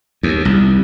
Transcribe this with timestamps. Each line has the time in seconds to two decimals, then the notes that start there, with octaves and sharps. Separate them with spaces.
0.23 D#2
0.45 C2